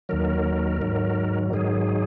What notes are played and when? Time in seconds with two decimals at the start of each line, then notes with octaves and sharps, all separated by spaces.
0.09 D#2 D#3 F#3 A#4
0.81 G#2 D#3 F#3
1.53 G#2 D#3 F#3 G#4